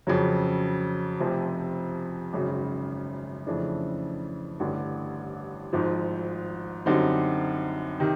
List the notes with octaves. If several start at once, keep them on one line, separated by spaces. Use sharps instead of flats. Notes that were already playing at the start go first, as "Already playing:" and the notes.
F2 C#3 F#3
F1 F2 C3 F3
G#1 F#2 C#3
F2 C#3 E3 A3 D4
A1 G2 D3 G3
G#1 G#2 F3
F#2 D3 G3 C4 D#4
C3 D#3